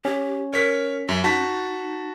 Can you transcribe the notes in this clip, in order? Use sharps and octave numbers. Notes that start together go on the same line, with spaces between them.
C#4 G4
A#4 C#5 B6
F#2 E5
D#4 F#4 A5 B6